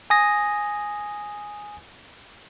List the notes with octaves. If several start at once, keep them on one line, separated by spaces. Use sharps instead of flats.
G#5 D#6 A#6